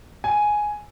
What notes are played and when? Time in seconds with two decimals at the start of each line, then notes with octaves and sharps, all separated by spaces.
0.24 G#5